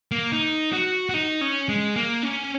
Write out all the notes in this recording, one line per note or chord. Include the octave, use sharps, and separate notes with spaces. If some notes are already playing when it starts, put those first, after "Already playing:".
A#3
D#4
F#4
F#4
D#4
C#4
G#3
A#3
C#4